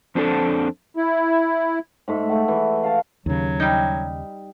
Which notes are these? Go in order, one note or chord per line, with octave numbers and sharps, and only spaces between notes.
F2 C4 D4 F4 A4
E4
G#2 A3 E5
A3 F#5
E3
F5 A5
D#2 C#3 F#3
G3 D#4